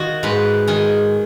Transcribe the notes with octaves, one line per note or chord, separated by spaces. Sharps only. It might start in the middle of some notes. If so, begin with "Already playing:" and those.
Already playing: D#3 D#4 F#4
G#2 B4
D#3 G#4